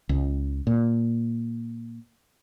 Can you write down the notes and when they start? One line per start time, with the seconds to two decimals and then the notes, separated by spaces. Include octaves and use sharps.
0.09 C#2
0.67 A#2